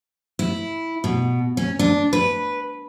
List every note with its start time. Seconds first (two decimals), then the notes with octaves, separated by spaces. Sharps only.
0.39 E4
1.04 B2
1.57 C#4
1.79 D4
2.13 B4